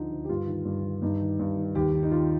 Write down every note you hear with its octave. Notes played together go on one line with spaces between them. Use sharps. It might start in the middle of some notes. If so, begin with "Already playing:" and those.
Already playing: D2 D3 F3 D#4
D2
G4
G2 F4
D#3
G2
D#3
G2 D#4
D#3
G2
D#3
D#2 G4
D#3
D#4
D#2 F4